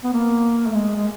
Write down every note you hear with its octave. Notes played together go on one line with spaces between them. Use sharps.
B3
A#3
A3
G#3
G#3